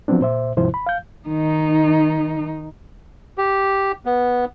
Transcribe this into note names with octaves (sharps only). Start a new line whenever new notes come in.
F3 F#3 B3 C4 D4
A#2 C5 E5
D#2 G#2 C3 F3 E4 C5
B5
F5 G6
D#3 D#4
G4
B3